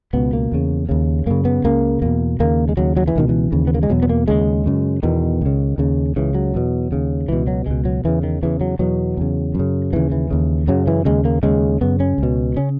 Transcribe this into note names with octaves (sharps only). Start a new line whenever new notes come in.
C#2 B2 B3
A#3
E2 C#3
D#2 C#3
F#2 C#3 A#3
B3
C#2 C#3 A#3
E2 B2 A#3
D#2 C#3 A#3
G#3
D#2 C#3 F#3
F#3
E3
C#2 B2 D#3
E3
D#2 C#3
B3
A#3
G#3
E2 B2 F#3
B3
A#3
D#2 C#3 G#3
F#2 C#3
E2 B2 D#3
C#2 C#3
D#2 C#3
C#2 C#3 E3
F#3
E2 B2
D#2 C#3
C#2 B2 E3
F#3
C#2 B2 G#3
F#3
E2 C#3 E3
D#3
E2 C#3 E3
F#3
E2 B2 F#3
E2 C#3
F#2 C#3
D#2 C#3 E3
E3
D#2 C#3
F#2 C#3 F#3
E3
D#2 C#3 G#3
A#3
D#2 C#3 G#3
F#2 C#3 B3
C#4
C#2 B2
C#3 C#4